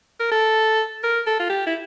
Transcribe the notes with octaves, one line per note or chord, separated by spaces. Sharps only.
A#4
A4
A#4
A4
F4
G4
E4